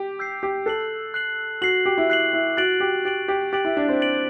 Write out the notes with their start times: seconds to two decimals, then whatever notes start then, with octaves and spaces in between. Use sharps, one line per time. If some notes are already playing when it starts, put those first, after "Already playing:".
Already playing: G4
0.19 E6 G6 C7
0.43 G4
0.66 A4 F#6 C7 F#7
1.14 F#6 C7 F#7
1.62 F#4 F#6 C7 F#7
1.86 G4
1.98 E4
2.10 F#6 C7 F#7
2.33 E4
2.57 F#4 F#6 A6 D7 F#7
2.80 G4
3.05 G4 F#6 A6 D7 F#7
3.28 G4
3.53 G4 F#6 A6 D7 F#7
3.65 E4
3.77 D4
3.88 C4
4.00 F#6 A6 D7 F#7